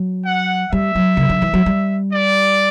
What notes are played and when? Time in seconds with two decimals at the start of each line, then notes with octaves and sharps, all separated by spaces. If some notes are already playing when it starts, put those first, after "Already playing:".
Already playing: F#3
0.26 F#5
0.72 G3 E5
0.95 F#3
1.17 C#3
1.29 D3
1.42 E3
1.54 F#3
1.66 G3
2.13 D5